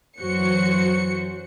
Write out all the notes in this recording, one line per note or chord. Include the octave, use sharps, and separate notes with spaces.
F#2 E3 F#3 F#4 C5 C#7